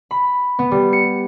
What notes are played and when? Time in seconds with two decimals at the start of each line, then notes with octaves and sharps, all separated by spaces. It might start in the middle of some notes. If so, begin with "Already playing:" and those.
0.11 B5
0.59 B3
0.71 G3
0.93 C#7